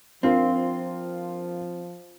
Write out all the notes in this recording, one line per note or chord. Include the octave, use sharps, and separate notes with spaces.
F3 C4 D4 F4 A#4